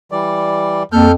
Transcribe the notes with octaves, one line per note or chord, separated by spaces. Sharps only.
E3 G3 D5
F2 A#3 A4 F6 G6